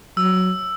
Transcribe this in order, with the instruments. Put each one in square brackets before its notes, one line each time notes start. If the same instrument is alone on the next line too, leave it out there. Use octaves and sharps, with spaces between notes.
[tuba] F#3 [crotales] E6